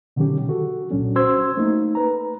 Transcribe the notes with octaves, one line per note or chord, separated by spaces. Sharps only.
B2 D3 D#3 F#3 C#4 G4
F#4 A4
C2 A#2 F#3 C#4 D4
C#4 F#4 C5 C6 E6 G#6
A3 A#3 D#4
B4 A#5